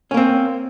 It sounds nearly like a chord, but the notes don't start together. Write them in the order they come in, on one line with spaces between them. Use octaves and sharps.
C#4 A#3 C4